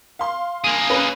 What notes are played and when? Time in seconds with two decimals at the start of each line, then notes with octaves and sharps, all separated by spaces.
0.19 F5 C6
0.64 A#3 G#4
0.90 C#4 B4